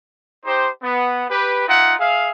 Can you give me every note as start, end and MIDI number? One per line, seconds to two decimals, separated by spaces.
0.45 0.68 63
0.45 0.68 67
0.45 0.68 72
0.83 1.24 59
1.29 1.64 67
1.29 1.64 71
1.67 1.94 63
1.67 1.94 65
1.67 1.94 76
1.67 1.94 78
1.99 2.30 68
1.99 2.30 76
1.99 2.30 77